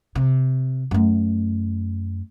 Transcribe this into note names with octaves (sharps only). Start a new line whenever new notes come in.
C3
F#2 A3